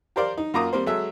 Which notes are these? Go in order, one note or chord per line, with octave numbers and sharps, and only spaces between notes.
G4 A#4 C5 D5 F5
D#4
F#2 A#3 F4 A#5 D6 D#6
G3 A#3 C4 C5
F#3 G#3 A4 E5